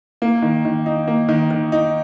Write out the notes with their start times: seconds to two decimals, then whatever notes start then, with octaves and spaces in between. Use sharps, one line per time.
0.22 A#3
0.42 D#3
0.65 D#3
0.86 D#4
1.07 A#3
1.29 D#3
1.51 D#3
1.72 D#4